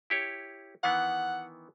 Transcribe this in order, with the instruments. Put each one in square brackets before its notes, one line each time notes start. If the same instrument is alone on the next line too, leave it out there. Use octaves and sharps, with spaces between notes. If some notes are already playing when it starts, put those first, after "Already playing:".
[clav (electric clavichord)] E4 G4 C#5
[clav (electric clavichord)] D#3 E3 B3 [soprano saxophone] F#5